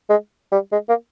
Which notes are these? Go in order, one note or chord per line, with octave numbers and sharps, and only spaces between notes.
G#3
G3
G#3
A#3